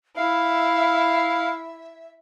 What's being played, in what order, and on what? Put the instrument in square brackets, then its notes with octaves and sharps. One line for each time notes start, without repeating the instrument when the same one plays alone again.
[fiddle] E4 [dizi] E5 [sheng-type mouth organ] F5